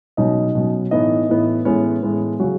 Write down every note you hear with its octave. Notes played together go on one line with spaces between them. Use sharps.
B2 F#3 C#4 D#4 D#5
B2 F#3 C#4
A2 E3 B3 D#4 D#5
A2 E3 B3
A2 E3 G#3 B3 C#4 C#5
A2 E3 G#3 B3
C#3 F#3 C#4 F#4